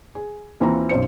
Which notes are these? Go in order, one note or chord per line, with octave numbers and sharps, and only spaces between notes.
G#4
D#2 E3 C4 F4 A#5
B1 F#2 C5 C#7